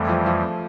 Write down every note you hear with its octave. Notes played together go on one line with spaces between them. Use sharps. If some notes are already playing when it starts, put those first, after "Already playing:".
Already playing: F2 E3 G3 A3
F3
F3